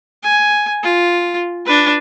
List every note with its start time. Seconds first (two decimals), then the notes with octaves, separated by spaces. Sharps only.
0.23 G#5
0.83 F4
1.66 D4 B4